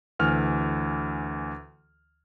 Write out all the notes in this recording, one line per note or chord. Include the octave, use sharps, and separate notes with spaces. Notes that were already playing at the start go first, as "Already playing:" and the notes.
D2 E3 F6